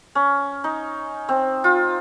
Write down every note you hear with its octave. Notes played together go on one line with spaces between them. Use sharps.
C#4
D#4
C4
F4